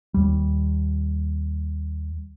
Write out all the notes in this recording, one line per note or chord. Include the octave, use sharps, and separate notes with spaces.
D#2 G3